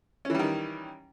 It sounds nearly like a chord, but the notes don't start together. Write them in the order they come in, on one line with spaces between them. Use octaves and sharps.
C#4 E3 G3 D#3